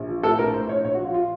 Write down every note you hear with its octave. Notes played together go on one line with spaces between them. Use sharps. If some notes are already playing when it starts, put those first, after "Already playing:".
Already playing: A#1
F3
A2 A4
A#1 A#4
A2 C5
A#1 C#5
A#1 C#5
F#4
F3 F4
F4